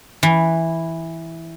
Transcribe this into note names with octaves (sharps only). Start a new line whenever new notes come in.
E3